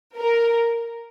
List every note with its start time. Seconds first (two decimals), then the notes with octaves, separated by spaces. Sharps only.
0.18 A#4